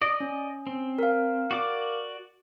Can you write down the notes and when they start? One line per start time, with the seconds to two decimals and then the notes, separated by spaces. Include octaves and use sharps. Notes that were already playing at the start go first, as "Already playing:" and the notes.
0.02 D5 D#5
0.20 C#4
0.67 C4
0.99 A#4 F5
1.51 F#4 D5 D6